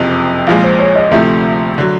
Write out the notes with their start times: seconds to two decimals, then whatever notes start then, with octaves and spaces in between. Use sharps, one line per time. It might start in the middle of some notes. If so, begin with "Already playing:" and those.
Already playing: F#1 F2 C3 F3
0.47 A#1 A#2 F3 G#3 F5
0.63 C5
0.79 C#5
0.96 D#5
1.11 D2 C3 F3 A3 E5
1.78 D3 F#3